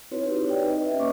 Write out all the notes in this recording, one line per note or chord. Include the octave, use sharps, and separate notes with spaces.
C4 D#4 E4 F#4 B4 C#5
G4
D#4 D5 G5
B4 D#5
C#4 E5
A#3 B4 C#5 D#5 C#6 D6